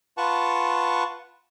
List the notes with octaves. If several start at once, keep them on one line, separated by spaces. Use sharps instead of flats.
F4 B4 F#5 A5 C#6